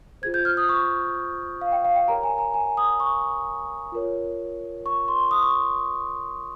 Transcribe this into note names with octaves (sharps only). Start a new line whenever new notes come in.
F4 G#4 C5 G#6
G6
F6
D#6
C#6
F5
G5
F5
G5
G4 A#4 C#5 A#5
G#5
A#5
G#5
D#6
C#6
F4 A#4 C#5
C#6
C6
D#6
C#6